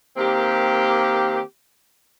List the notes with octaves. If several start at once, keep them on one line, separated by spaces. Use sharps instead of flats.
D#3 A#3 C4 G4